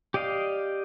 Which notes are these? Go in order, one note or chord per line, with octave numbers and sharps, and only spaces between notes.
G4 D5 D#5 F5